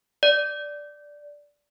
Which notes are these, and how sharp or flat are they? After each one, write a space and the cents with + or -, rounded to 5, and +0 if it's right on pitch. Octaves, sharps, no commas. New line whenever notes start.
D5 -10